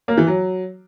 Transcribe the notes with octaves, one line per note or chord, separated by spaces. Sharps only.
A#3
E3
F#3